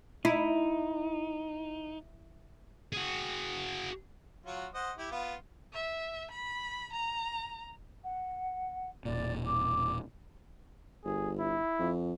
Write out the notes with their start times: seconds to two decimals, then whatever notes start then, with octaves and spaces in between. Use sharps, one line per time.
0.25 D#4 E4
2.93 F#4 G#4
4.46 F#3 F4 F#4
4.74 C5 D#5 F#5
4.98 E4 G4
5.11 B3 F4
5.73 E5
6.31 B5
6.93 A#5
8.04 F#5
9.05 E1 A#2 D5
9.46 D6
11.05 G1 G#4
11.39 E4
11.79 F2